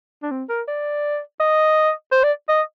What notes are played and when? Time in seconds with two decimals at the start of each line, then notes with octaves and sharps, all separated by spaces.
0.23 D4
0.31 C4
0.49 A#4
0.68 D5
1.40 D#5
2.12 C5
2.24 D5
2.49 D#5